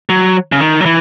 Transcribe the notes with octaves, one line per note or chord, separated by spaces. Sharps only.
F#3
C#3
D#3
F#3
E3